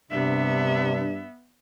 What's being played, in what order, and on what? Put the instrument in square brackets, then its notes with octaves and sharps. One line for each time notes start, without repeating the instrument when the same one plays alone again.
[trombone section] G2 D4 [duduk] C3 [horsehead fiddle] B3 E5